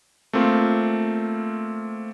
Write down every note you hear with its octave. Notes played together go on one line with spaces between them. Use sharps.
A3 A#3 C4 F4